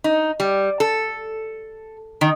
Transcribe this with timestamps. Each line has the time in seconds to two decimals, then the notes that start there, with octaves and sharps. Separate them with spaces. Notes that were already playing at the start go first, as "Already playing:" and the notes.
0.04 D#4
0.40 G3
0.80 A4
2.21 D#3